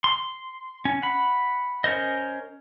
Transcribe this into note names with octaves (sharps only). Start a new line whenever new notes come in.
C6
C#4
F#5 B5
C#4 A#4 C5 D#5